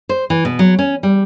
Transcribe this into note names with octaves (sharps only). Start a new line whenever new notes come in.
C5
E3
B2
F#3
C#4
G3